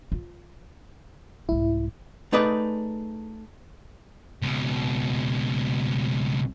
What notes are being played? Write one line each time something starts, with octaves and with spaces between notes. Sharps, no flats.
F4
C2 G#2 E4
A3 D#4 G#4 B4 D5
C#2 B2